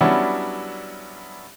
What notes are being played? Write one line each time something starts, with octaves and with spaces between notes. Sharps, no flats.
F#3 G3 B3 C#4 D4 E4